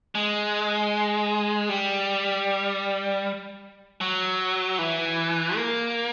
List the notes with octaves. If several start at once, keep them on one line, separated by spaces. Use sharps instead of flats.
G#3
G3
F#3
E3
A#3